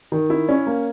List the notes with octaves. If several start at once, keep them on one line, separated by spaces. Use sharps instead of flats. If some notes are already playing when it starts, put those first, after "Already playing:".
D#3
E4
C#4
A#3